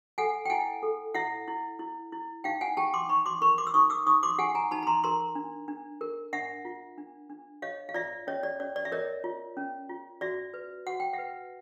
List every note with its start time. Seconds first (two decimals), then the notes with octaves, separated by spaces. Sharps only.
0.18 A4 F#5 G#5
0.45 G5
0.50 E4 F#5 G#5
0.83 A4
1.14 E4 E5 F#5
1.48 E4
1.79 E4
2.12 E4
2.44 D#4 F5 G5
2.61 F#5 G#5
2.77 G4 G5 A5
2.94 C6 D6
3.09 D#4 B5 C#6
3.26 C6 D6
3.41 A#4 B5 C#6
3.58 C6 D6
3.67 E6
3.74 D#4 C#6 D#6
3.90 D6 E6
4.06 D#4 C#6 D#6
4.23 C6 D6
4.39 G4 F#5 G#5
4.55 G#5 A#5
4.71 D#4 A5 B5
4.83 B5
4.87 A#5 C6
5.04 A#4 A#5 C6
5.35 D4
5.68 D4
6.01 A#4
6.33 D4 E5 F#5
6.65 F4
6.98 D4
7.30 D4
7.62 C#5 D#5 F5
7.89 F5
7.94 F4 D5 E5
8.27 C#4 C#5 D#5
8.43 D5
8.60 C#4 D5
8.76 D5
8.85 E5
8.92 A#4 C#5 D#5
9.24 F4
9.57 C#4
9.89 F4
10.21 F#4 D5 E5
10.54 B4
10.87 F#4 F#5
11.00 G5
11.13 E5 F#5
11.18 B4